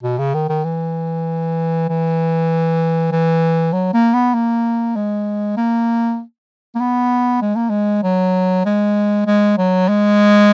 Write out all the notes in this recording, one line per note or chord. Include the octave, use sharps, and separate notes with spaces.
B2
C#3
D#3
D#3
E3
E3
E3
F#3
A#3
B3
A#3
G#3
A#3
A#3
B3
G#3
A#3
G#3
F#3
G#3
G#3
F#3
G#3